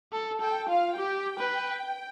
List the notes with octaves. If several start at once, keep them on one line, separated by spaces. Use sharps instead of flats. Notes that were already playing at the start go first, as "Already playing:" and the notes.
A4
A4 G5
F4 F5
G4 G5
B4